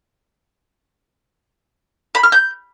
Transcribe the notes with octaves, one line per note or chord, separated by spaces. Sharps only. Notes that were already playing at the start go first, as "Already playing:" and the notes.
B5
F6
G6